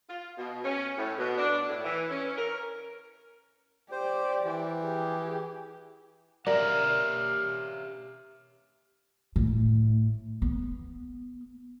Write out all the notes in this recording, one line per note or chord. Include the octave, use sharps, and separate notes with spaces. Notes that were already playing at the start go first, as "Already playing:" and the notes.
F4
B2
C#4
A2
B2
D4
A2
E3
C#4
A#4
G4 C5 D5
E3
G4 G#4
G4 A#4 C#5 D5 E5 F5
A2
B3